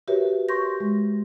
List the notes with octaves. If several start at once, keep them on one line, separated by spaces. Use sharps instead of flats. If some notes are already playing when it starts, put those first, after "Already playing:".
F#4 G4 A#4 B4 C#5 E5
C6 C#6 G6 A#6
G#3